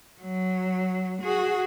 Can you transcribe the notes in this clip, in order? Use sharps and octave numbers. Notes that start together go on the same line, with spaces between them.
F#3
F#4 G#4